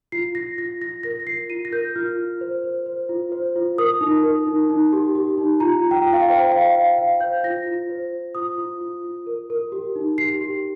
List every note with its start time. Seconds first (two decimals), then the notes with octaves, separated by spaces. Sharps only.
0.12 F4 C7
0.35 F4 A#6
0.58 F4 A#6
0.81 F4 A#6
1.03 A#4 A#6
1.20 A#6
1.27 F4 C7
1.50 F4 D#7
1.65 A#6
1.72 A#4 G6
1.96 F4 F6
2.18 F4
2.41 C5
2.63 C5
2.86 C5
3.09 F4
3.32 C5
3.56 F4
3.78 A#4 D#6
4.01 D#4
4.23 A#4
4.47 D#4
4.70 D#4
4.93 G4
5.15 G4
5.38 D#4
5.60 F4 A#5
5.84 F4
5.91 G5
6.07 F4
6.13 F5
6.22 G5
6.30 C5
6.52 C5 F5
6.75 C5 F5
6.98 C5 F5
7.20 C5 G6
7.44 F4 A#6
7.66 F4
7.89 C5
8.12 F4
8.35 F4 D#6
8.58 F4
8.81 F4
9.04 F4
9.27 A#4
9.50 A#4
9.72 G4
9.95 D#4
10.18 G4 C7
10.41 G4